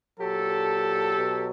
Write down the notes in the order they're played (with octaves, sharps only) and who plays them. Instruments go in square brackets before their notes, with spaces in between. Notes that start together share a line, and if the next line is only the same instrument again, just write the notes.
[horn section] A#2 F#3 G4 A4
B2 F#3